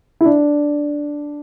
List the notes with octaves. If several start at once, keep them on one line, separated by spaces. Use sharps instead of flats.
E4
D4